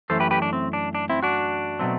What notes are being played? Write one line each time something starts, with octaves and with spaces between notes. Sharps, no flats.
F#2 E3 A3 A4 C5
G4 B4
G4 B4
D4
C4
D4
D4
C4 E4
D4 F#4
B2 F#3 A3 C4